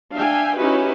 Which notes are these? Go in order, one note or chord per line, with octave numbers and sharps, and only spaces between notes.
D4 E5 F5 G5 G#5
C#4 D#4 E4 F#4 G4 B4